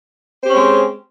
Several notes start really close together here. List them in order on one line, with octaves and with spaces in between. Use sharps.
C5 G4 C#4 C4 G#3